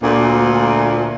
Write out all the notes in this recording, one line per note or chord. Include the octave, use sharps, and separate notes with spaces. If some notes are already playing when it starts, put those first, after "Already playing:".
D2 A#2